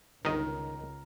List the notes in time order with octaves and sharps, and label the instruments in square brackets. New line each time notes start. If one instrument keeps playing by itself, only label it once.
[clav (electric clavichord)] G1 D#5 [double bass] C#2 [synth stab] D#3 [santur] A#4